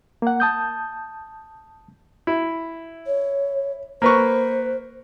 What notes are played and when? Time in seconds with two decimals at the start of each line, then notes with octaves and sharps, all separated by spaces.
0.22 A#3 F#5
0.40 A5 D#6 G6
2.27 E4
3.07 C#5
4.02 A#3 B4 C5 C#6